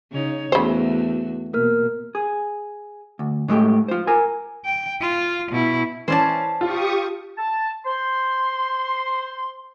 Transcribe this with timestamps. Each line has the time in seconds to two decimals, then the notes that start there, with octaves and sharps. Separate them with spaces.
0.12 C#3 D#4 C#5
0.52 E2 C#3 A3 F#4 C5
1.53 B2 A#3 A#4 F6
2.15 G#4
3.19 D2
3.48 A2 G#3 A3 G4
3.88 F4 C5
4.07 A#4 G#5
4.65 G5
5.01 F4 F5
5.52 B2 E4
6.08 E3 C#4 C5 D5 A5
6.61 F4 G4 C#6 D#6
7.38 A5
7.85 C5 C6